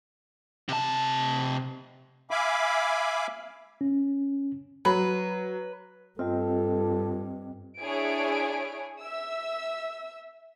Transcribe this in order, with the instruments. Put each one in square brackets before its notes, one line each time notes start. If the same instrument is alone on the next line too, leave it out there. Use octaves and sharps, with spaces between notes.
[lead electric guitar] C3 A5
[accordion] E5 F5 G#5 B5 D6
[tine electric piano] C#4
[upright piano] F#3 [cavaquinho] B4
[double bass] G2 [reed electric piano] C4 D#5 G5 [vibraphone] F4 [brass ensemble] A4
[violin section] D4 E4 G#4 C#5 G#5 D7
E5 E6